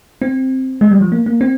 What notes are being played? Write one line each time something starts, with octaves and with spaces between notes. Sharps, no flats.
C4
G#3
G3
F3
A#3
A#3
C4